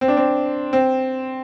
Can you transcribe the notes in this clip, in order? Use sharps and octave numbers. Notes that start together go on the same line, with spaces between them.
C4
D4
C4
C4